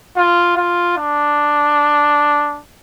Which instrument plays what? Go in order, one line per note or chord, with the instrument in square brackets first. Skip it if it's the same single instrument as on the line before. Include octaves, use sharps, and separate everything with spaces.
[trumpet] F4
F4
D4